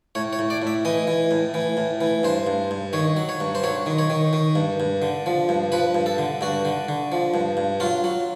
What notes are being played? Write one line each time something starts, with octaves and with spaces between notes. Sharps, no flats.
A2 C#5
C#5
A2
D5
A2
E5
E3 D#5
E3
A2
E3
A2
E3
G2 C5
G2
G2
D#3 C#5
F#3
C#5
G2
C5
F#3 C#5
D#3
C#5
D#3
D#3
G2
G2
D3
F3
G2
F3 B4
G2
A4
D3
G2 F#4
D3
D3
F3
G2
G2
F#3 F4
F#3